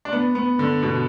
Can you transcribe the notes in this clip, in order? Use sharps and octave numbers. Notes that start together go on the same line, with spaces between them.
D4
B3
B3
D3
B2